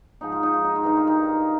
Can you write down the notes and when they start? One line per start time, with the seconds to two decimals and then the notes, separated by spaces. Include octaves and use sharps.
0.21 G#2 F3 D#4
0.32 F4
0.43 D#4
0.53 F4
0.64 D#4
0.75 F4
0.83 G2 D#3 D#4
0.97 F4
1.07 D#4